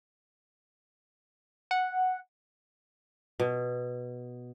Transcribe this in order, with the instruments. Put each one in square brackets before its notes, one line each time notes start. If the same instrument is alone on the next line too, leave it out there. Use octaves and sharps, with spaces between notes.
[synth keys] F#5
[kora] B2